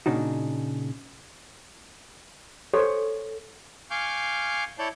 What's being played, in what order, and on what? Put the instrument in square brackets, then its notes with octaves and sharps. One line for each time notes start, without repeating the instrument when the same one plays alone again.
[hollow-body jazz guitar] A#2 C#3 D4 D#4 F#4
[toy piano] A4 [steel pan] C5 C#5
[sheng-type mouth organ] F5 G#5 C#6 D6 F6 G6
E4 C#5 D5 A5 G6